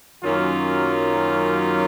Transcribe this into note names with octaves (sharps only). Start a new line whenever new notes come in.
F#2 D#3 F#3 A#3 C#4 F4